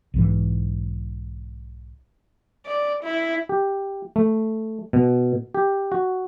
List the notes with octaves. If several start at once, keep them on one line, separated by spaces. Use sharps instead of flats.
B1 G#2 E3
D5
E4
G4
A3
B2
G4
F#4